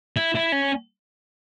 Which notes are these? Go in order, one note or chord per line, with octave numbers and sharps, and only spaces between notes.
E4
E4
C#4